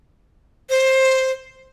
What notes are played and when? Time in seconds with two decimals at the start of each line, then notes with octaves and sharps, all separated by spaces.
0.70 C5